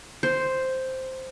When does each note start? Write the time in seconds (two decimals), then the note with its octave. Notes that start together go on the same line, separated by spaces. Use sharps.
0.23 C5